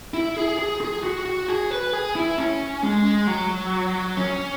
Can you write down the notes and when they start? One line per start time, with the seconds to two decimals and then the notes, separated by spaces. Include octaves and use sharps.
0.14 E4
0.36 G#4
0.59 G#4
0.81 G#4
1.04 F#4
1.26 F#4
1.48 G#4
1.71 B4
1.93 G#4
2.15 E4
2.38 C#4
2.83 G#3
3.27 F#3
4.17 C#4